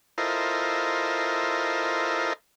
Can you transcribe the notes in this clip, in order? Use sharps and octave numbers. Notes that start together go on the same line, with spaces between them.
E4 F4 A4 A#4 C5 D#5